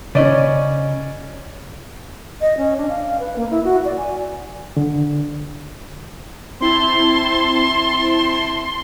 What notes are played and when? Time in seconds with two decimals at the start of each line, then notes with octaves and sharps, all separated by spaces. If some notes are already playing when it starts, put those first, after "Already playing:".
0.15 C#3 C#4 D5 D#5
2.41 D#5
2.57 C#4
2.77 D4
2.89 F5
3.03 F5
3.20 B4
3.36 A#3
3.51 E4
3.64 F#4
3.85 D5
3.97 G#5
4.77 D3
6.61 C4 E4 A5 C6